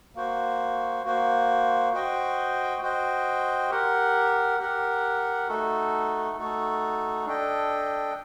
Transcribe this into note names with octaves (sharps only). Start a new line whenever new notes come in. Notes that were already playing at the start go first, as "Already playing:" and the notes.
A#3 F#4 C5
A#3 F#4 C5
F#4 C5 D#5 G5
F#4 C5 D#5 G5
G4 A#4 F#5
G4 A#4 F#5
A3 D#4 F#4 A4
A3 D#4 F#4 A4
D4 A4 D#5 G5